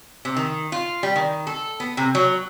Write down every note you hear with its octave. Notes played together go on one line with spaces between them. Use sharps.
C3
D#3
F4
G3
D#3
A4
B3
C3
F#3